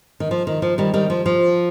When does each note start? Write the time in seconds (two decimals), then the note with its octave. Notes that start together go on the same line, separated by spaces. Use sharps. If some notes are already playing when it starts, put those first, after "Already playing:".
0.20 D#3
0.31 F3
0.47 D#3
0.62 F3
0.78 D#3 G3
0.94 D#3 G3
1.10 F3
1.26 F3